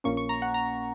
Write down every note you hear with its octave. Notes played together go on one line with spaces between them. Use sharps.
A#1 A#2 A#3 C#4 C#6
C#6
A#5
F#5
A#5